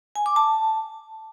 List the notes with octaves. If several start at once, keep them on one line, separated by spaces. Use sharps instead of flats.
G#5
D6
A5